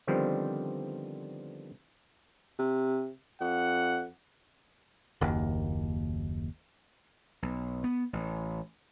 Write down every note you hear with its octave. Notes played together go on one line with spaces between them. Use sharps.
D3 D#3 F3 G3 B3 C4
C3
F2 F#5
F#1 D#2
B1
B3
A1